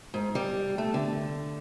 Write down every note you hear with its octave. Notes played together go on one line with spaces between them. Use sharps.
G#2
G3
A3
D3